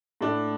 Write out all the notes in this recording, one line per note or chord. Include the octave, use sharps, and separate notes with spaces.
A2 A3 D4